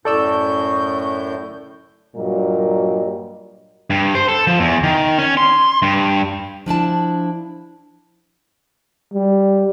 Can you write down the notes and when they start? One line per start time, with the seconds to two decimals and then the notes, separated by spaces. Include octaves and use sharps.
0.05 F#2 A2 A4 D5 C#6 E6 G6
2.16 G2 A#2 F#3 G3 A#4 D#5
3.90 G2
4.15 C5
4.28 A4
4.47 F3
4.60 E2
4.84 D#3
5.19 C#4
5.37 C6
5.82 G2
6.66 F3 D4 E4 A5
9.14 G3